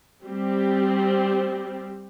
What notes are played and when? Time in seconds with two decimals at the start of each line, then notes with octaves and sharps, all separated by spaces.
0.22 G3 C4 G4